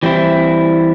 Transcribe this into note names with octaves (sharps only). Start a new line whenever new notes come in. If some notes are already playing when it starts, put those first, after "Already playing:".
E3 G3 C4 E4